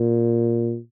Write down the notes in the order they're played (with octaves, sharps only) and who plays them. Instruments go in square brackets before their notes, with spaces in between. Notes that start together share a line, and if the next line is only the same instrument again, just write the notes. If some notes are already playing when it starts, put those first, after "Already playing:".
Already playing: [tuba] A#2